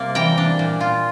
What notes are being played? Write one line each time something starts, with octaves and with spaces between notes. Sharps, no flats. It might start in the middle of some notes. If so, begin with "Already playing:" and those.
Already playing: C3 G3 A#3 D5
E3 G5 A#5
D4
A#2
F4